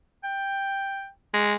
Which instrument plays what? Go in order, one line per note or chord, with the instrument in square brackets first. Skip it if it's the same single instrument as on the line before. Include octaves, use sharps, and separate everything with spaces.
[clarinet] G5
[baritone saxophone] G#3